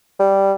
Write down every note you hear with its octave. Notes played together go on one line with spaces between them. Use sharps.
G3